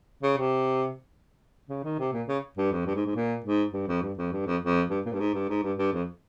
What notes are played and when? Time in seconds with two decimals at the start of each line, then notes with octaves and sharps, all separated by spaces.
0.23 C#3
0.37 C3
1.69 C#3
1.84 D#3
1.99 C3
2.12 A#2
2.28 C#3
2.57 G2
2.72 F2
2.86 G2
2.95 G#2
3.06 G#2
3.15 A#2
3.44 G#2
3.73 G2
3.88 F2
4.02 G2
4.17 F2
4.32 G2
4.46 F2
4.61 F2
4.90 G2
5.06 A#2
5.13 G2
5.20 G#2
5.34 G2
5.49 G#2
5.63 G2
5.78 G2
5.93 F2